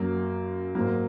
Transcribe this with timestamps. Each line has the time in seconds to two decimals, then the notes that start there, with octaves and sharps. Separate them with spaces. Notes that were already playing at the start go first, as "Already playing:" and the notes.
Already playing: F#2 F#3 A#3
0.75 G#2 F#3 A#3